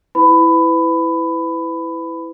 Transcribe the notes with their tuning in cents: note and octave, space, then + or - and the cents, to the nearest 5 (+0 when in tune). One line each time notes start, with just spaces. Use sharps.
E4 +0 B4 +30 B5 +15